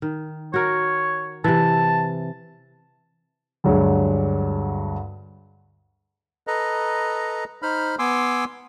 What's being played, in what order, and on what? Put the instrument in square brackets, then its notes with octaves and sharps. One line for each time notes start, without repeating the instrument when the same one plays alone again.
[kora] D#3
[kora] F#4 A#4 [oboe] C#5
[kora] C3 E3 [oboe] A5
[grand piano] D2 G2 F#3 G#3
[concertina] A4 B4 D#5 A#5
D#4 C5 B5 F6
B3 G#5 C6 D6 E6